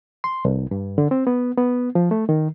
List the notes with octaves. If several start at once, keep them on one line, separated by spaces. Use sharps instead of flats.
C6
C2
G2
D3
C4
B3
B3
F3
A3
D#3